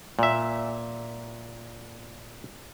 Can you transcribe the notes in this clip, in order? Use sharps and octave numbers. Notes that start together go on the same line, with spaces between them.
A#2 E5